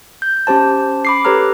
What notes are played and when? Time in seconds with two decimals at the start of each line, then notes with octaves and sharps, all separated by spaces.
0.22 G6
0.47 C#4 G4 C5 A5
1.05 B5 D6 C7
1.25 G4 A4 B4 C#5 A#5 F6